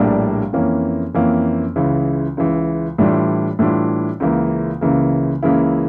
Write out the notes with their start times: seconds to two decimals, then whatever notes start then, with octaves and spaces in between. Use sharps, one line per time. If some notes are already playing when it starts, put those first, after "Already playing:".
Already playing: A#1 A2 G3 A#3 D4
0.53 F2 E3 A#3 C#4
1.14 F2 E3 A#3 C#4
1.76 C#2 C#3 E3
2.37 C#2 C#3 E3
2.98 A2 E3 G3 D4 F4
3.59 A2 E3 G3 D4 F4
4.20 C#2 C#3 E3 A#3
4.81 C#2 C#3 E3 A#3
5.43 C#2 C#3 E3 A#3 E4